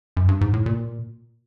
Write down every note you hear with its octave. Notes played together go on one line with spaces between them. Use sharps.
F#2
G2
G#2
A2
A#2